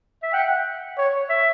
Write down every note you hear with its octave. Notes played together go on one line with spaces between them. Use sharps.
E5
F#5 G5
C#5
E5